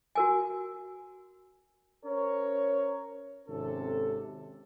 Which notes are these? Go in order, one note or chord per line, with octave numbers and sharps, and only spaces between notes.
F#4 A#4 G#5
C#4 A#4 C5 C#5
G#1 C3 C#4 A4